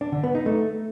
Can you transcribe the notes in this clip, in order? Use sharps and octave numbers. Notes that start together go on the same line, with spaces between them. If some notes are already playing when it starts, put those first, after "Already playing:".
D4
D3
B3
D#4
A3